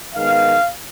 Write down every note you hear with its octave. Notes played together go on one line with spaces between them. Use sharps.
D#3 G#3 B3 F5